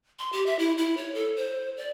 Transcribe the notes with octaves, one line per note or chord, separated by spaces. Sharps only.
C6
G4
E5
E4
E4
C#5
A4
C5
D5